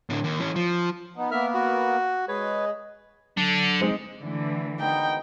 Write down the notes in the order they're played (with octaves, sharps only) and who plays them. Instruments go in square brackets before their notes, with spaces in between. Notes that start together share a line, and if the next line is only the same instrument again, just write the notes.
[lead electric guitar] A2 D3
D#2
E3 C#4
F3
[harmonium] B3 D#4
[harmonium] A#3 B3 A#4 [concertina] E5 F6
[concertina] F#4
[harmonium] G#3 G#4 [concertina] B4 C#5
[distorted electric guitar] D3 D4 [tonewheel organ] F#3
[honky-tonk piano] G#3 C4 D#4
[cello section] D3 E3 A3
[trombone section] G#1 B3 D#4 [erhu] G5